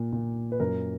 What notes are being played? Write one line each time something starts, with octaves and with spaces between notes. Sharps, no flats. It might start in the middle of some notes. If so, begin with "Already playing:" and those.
Already playing: A#2
A#2
B4
F#2 A#4